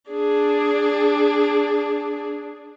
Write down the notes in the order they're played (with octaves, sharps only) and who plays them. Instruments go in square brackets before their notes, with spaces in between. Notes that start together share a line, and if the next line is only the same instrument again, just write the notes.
[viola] D4 G#4